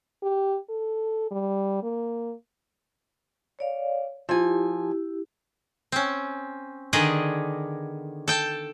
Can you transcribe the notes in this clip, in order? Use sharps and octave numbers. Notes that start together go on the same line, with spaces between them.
G4
A4
G3
A#3
C#5 D5 F5
F3 E4 G4 G#5
C4 C#4
D3 D#3 B3 G#4 D5 D#5
A4 G5 A5